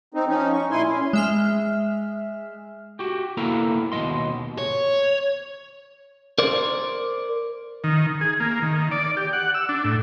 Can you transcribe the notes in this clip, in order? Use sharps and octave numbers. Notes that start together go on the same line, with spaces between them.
C4 D#4
F3 C#4 D#4
C#6
A#2 E4 G#5 C6
C#4
G#3 E5 F6
F#4 G4
A#3 B3 E4 A4 A#4 A#5
D#2 B2 D#3 A#3 D#5 C6
C#5
A#4 C5 D5
D#3
G#4
A#3
D#3
D5
G4
F#5
E6
D4
A2